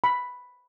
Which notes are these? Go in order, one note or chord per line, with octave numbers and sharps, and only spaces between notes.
B5